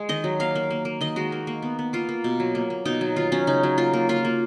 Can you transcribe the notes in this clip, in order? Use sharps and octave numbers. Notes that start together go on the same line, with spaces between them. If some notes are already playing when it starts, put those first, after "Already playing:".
Already playing: G#3
D#3 D#5
F#3
A#3 F5
A#3
A#3
A#3
D#3 D#5
G#3 F#4
A#3
A#3
B3
B3
A#3 F4
A#3
B2
F#3
A#3
A#3
B2 D#4
F#3
D#3 F4
F#3 C#4
C#3 D#4
F#3
A#3 F4
A#3
A#3 F4
A#3